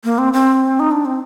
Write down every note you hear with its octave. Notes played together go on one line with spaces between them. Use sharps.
A#3
C4
C4
D#4
D4
C4